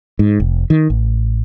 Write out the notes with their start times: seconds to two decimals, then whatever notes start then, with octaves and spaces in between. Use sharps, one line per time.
0.19 G#2
0.40 F1
0.70 D#3
0.90 A1